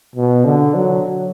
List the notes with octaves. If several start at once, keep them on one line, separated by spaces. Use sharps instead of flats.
B2
D3
F#3